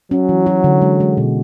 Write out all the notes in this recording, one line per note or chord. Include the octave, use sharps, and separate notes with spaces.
F#3 C#4
E3
F#4
D3
G#3
G#3
B2